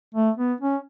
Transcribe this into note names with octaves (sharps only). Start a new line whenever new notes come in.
A3
B3
C#4